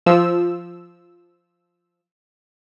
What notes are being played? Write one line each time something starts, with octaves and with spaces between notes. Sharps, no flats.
F3 E6